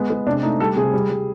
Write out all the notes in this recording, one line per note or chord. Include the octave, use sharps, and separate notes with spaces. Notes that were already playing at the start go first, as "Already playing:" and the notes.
Already playing: G#3 B3
G#3
C3 D4
A3 D#4
G3 A4
C3 G#4
G3
G3